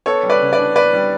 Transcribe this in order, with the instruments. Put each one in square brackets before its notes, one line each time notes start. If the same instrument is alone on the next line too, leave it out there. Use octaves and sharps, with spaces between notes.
[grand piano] B3 A4 C#5
G3
B4 D5
C#3
B4 D5
D4
B3 B4 D5
G3